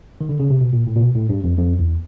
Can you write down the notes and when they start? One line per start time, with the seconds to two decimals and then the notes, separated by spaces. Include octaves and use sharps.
0.21 D#3
0.29 D3
0.40 C#3
0.50 C3
0.61 B2
0.73 A#2
0.87 A2
0.96 A#2
1.01 B2
1.15 A2
1.29 G2
1.44 F2
1.57 F2
1.79 E2